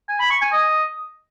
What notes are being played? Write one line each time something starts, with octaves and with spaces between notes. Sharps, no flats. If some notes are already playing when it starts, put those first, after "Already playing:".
G#5
B5
C#6
G#5
D#5